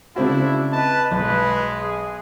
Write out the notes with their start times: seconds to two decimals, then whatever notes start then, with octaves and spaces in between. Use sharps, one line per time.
0.16 C#3 C4 D4 E4 F#4
0.73 B4 D#5 A5
1.11 B1 G#3 B4
1.80 G#4